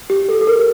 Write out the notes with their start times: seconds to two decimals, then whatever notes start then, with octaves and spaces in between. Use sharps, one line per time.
0.10 G4
0.29 A4
0.41 A4
0.47 A#4